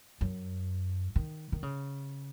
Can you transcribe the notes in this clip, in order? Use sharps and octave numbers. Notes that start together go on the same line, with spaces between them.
F#2
D#3
D#3
C#3